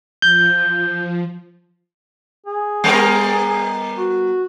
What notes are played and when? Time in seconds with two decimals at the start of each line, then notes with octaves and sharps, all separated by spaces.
0.22 F3 G6
2.47 G#4
2.84 G3 B3 A#4
3.97 F#4